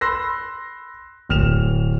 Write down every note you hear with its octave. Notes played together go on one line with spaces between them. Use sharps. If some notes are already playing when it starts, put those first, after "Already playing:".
B5 C6 E6 F#6 A#6
D1 F6 E7 F7